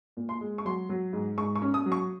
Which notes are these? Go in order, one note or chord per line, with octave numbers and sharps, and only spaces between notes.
A#2
C6
G#3
C#6
F#3 C6
F#3
G#2
G#2 C#6
C#6
C#4
D#6
F#3
C#6